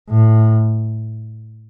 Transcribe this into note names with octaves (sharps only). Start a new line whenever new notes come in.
A2